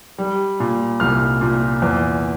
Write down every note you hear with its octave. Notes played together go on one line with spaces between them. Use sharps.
G3
A#2
C2 F6
A#2
E2